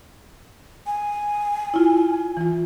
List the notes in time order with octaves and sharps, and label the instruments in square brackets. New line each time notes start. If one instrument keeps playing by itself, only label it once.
[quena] G#5
[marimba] E4 F4
E3 F4